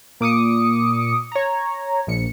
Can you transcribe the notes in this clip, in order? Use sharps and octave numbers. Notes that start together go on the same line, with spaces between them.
A#2 D6 D#6 C#7
C#5 A#5
A#1 C#7